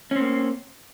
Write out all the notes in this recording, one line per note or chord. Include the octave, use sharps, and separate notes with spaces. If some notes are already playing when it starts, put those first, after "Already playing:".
A#3 C4 C#4